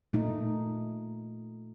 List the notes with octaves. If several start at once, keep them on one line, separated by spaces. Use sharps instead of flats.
A#2 A3 D#4